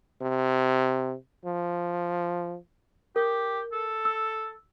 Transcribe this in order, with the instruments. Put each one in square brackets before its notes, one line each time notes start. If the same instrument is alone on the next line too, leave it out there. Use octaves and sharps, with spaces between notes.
[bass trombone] C3
F3
[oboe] G4 [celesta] A#4
[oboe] A4
[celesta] E6